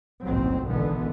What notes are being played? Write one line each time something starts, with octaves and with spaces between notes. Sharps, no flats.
F#1 B1 F2 A2 F#3 C4
G#1 B2 D3 E3 B3